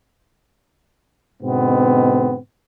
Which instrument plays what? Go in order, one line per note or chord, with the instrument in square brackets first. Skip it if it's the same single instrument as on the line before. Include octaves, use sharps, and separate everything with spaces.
[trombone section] G#2 B2 D3 B3 C4